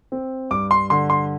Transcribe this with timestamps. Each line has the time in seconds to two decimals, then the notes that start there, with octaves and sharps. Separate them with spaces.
0.12 C4
0.51 G2 D6
0.71 C6
0.90 D3 C6
1.10 C6